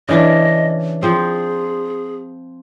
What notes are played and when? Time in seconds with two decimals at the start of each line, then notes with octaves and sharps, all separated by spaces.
0.09 C#3 E3 D4 D#5
1.03 F3 C4 G#4